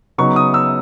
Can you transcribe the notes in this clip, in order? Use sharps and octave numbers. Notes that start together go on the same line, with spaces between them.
C#3 F#3 B3 D#4 C#6
D#6
E6